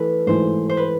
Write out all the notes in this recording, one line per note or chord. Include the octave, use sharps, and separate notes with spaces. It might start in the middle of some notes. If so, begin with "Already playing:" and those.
Already playing: E3 A3 A4 B4
G#2 E3 A3 C5
C5
B4